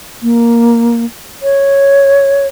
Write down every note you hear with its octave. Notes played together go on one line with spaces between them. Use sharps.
A#3
C#5